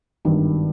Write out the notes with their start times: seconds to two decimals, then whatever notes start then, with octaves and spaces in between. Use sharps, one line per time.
0.25 G#1 G2 D#3